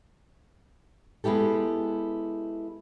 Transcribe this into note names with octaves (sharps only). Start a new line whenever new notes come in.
G#3 B3 E4 G4 A4